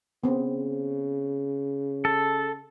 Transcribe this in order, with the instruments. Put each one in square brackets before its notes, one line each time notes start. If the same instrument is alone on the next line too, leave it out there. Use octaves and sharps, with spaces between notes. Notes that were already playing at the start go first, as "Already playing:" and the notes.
[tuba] C#3 [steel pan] B3 C4
[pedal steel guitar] A4